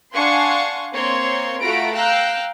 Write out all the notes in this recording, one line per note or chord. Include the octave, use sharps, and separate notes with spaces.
D4 F5 F#5 G#5 C6 C#6
A#3 C4 C#5 C6
A3 F4 F#4 A#5 B5 D7
F5 G5 A#5 E6 F#6